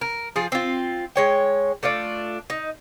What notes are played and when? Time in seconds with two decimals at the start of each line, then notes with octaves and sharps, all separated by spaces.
0.01 A#4
0.36 F3 F4 G#4
0.52 C4 F4
1.16 G#3 C#5 G5
1.83 A3 D4 F4 D5
2.50 D#4